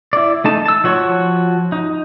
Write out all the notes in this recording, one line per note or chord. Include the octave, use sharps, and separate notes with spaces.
E4 D5
A3 D#4 A5
A5 E6
F3 F#4 C#5 C#6
D#4